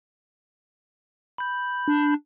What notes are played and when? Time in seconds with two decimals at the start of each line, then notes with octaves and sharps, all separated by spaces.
1.38 B5 G6
1.88 D4